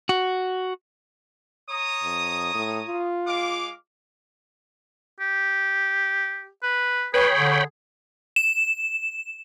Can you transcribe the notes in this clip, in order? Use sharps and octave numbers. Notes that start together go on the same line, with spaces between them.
F#4
C#5 A#5 D#6
F2
A2
F4
G#3 F5 D6
G4
B4
G#4 B4 C#5 G5 B5
D3
E7